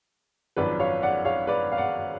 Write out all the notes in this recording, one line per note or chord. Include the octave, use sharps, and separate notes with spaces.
G#1 F#2 F3 B4 D5
C#5 F5
D5 F#5
C#5 F5
B4 D5
F5
D5 F#5